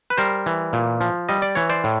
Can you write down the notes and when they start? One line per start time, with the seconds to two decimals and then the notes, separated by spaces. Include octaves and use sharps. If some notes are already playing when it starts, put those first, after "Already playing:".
0.10 B4
0.17 G3 A#4 C5
0.46 E3
0.73 A#2
1.01 F3
1.29 G3 D#5
1.42 D5
1.55 E3 C#5
1.69 C5 D5
1.84 A2